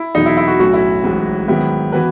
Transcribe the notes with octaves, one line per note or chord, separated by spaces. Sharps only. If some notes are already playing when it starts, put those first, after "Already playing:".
Already playing: E4
E2 B2 F#3 D#4
E4
E4
F#4
B1 A2 F#3 C#4 F#4
E4
A1 G#2 F#3
G#2 D#3 F#3 B3 E4
E3 B3 F#4 B4